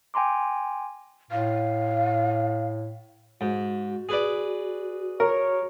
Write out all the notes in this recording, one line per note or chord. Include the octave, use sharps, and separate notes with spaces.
G5 G#5 A#5 C6 D6
A2 F5
G#2 F#4
G#4 B4 D5
A#4 C#5